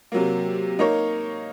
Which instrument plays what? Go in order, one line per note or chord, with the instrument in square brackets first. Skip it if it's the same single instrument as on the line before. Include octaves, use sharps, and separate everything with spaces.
[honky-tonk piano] C3 F#3 A#3
A#3 D#4 A#4 C#5